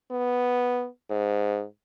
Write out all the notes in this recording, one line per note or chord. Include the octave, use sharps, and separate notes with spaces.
B3
G#2